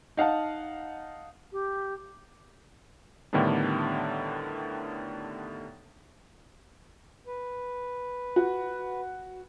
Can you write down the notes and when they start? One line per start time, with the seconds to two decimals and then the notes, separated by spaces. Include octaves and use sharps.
0.17 D#4 F5 F#5 A5
1.52 G4
3.33 A2 D3 D#3 G3 B3 D4
7.27 B4
8.36 F#4